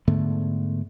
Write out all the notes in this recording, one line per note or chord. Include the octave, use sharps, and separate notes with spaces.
G#2 D3 A3 B3